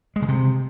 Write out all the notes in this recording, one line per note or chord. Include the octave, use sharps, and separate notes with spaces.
G#3
C#3
C3